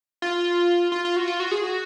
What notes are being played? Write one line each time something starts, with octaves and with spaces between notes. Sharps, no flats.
F4
F4
F4
F#4
F4
F#4
G#4
F#4